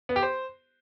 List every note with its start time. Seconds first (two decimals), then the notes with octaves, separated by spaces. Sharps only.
0.09 B3
0.16 G4
0.23 C5